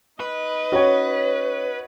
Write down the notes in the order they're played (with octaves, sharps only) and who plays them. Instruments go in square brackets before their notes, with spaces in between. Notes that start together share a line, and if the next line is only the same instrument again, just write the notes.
[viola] D#4 D#5 [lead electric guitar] B4
[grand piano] C#4 [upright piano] F#4 C#5